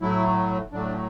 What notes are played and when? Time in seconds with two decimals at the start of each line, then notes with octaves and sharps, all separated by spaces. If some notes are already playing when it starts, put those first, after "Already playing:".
0.02 A2 F#3 A3 E4
0.72 A2 F#3 A3 D4